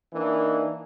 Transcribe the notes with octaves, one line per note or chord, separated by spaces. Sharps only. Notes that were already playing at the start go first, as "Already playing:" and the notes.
E3 A#3 D4 D#4